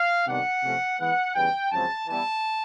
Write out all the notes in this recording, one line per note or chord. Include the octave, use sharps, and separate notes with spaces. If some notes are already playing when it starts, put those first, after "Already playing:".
Already playing: F5
C3 D#3 G3 B3 D4 F#5
C3 F3 A3 C#4
E3 G#3 B3 F#5
E2 C#3 E3 G3 G5
F#2 C#3 F3 G#3 C4 A5
E3 G3 B3 E4 A5